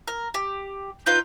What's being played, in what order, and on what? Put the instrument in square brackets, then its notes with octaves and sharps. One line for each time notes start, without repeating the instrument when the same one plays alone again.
[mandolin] A#4
G4
[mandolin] D#4 F4 B4 [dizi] G6